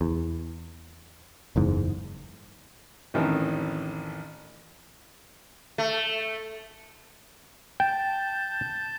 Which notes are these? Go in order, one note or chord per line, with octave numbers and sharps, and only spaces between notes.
E2
F#1 E2 G#2
A1 F2 D#3 E3 C#4 A5
A3
G5 A5 G6